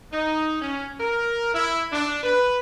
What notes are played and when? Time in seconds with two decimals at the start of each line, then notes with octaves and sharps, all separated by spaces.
0.12 D#4
0.61 C#4
0.99 A#4
1.54 E4
1.92 D4
2.23 B4